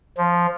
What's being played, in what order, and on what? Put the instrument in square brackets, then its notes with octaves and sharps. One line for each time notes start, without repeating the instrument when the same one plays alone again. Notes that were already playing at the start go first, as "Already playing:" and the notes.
[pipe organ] F3